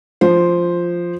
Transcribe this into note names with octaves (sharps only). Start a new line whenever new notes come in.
F3 C5